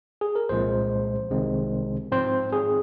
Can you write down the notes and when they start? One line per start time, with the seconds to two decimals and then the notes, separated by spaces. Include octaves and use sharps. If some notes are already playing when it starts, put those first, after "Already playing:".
0.21 G#4
0.35 A#4
0.49 C2 A#2 F3 G#3 C4 C5
1.30 C2 C3 D#3 G#3 C4
2.12 G#2 F3 C4 C5
2.53 G#4